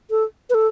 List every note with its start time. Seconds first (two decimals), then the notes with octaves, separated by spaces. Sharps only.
0.10 A4
0.50 B4
0.54 A4